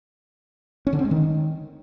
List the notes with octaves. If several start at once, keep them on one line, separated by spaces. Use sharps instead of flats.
C#4
D3
C4
G#3
D#3